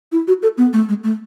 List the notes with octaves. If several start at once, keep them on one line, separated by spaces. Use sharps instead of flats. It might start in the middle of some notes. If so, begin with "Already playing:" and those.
E4
F#4
A4
B3
A3
G#3
A3